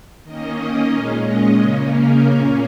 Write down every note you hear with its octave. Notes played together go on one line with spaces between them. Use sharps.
D#3 A#3 C#4 D#5
A#2 G#3 C#4 F5
D#5
C#3 A#3 C#4
A#4
A#2 A#3 C#4 C#5